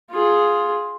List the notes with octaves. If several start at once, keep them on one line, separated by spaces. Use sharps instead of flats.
F4 G#4